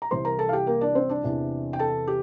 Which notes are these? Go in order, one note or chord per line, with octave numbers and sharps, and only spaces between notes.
A#5
C2 C3 E3 C5 C6
A#4 A#5
A4 A5
F5
G4 G5
A#3 A#4
D4 D5
C4 C5
D4 D5
E2 C3 E3
G5
A4 A5
G4